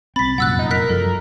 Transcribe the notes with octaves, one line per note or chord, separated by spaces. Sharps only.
C2 C4 B5 A6 B6
F1 F#2 A#2 F#5 E6 F#6
D#4
A#4 F#6 B6
F#2 F3 F#3 A4